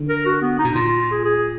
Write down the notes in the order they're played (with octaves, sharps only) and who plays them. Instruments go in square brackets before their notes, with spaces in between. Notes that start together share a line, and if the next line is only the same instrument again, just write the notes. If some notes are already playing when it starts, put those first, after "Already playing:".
Already playing: [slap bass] D3
[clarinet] A#4
F#4
B3
D#4
[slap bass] B2
[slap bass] A#2 [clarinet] F4
[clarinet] F4
F4
G#4
G#4